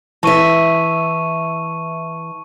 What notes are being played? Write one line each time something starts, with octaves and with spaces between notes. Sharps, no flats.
E3 E5 A5 C#6 D#7